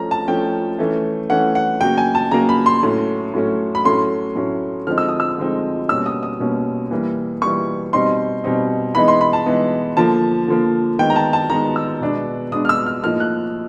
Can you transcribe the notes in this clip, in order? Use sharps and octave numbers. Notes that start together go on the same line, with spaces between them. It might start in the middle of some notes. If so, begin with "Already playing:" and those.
Already playing: F3 A3 C#4 A#5
A5
F3 A3 C#4 G5
E3 A3 C#4
E3 A3 C#4 F#5
F#5
C#3 F#3 A#3 G5
G#5
A5
C#3 F#3 A#3 A#5
B5
C6
A2 F#3 A3 C#4
A2 F#3 A3 C#4
B5
A2 F#3 A3 C#4 C6
A2 F#3 A3 C#4
D3 F3 G#3 C4 D#4 F6
E6
D#6
E6
D3 F3 G#3 C4 D#4
B2 G3 A#3 C#4 E6
D#6
D#6
B2 G3 A#3 C#4
E3 G3 A#3
E3 G3 A#3 C#6
B2 G3 C4 D#4 C6
B2 G3 C4 D#4
E3 G#3 B3 D#4 B5
C6
B5
A5
E3 G#3 B3 D#4
D3 F3 A#3 A5
D3 F3 A#3
D#3 G#3 B3 G5
A#5
A5
A5
D#3 G#3 B3 A#5
E6
B2 G#3 B3 D4
B2 G#3 B3 D4 D#6
F6
E6
F6
A2 F3 A#3 D#4 F6
F#6